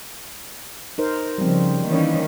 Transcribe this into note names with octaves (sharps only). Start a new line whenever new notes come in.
D#4 A#4 C5
C#3 F3 G3 C4
D#3 E3 A#3 C#4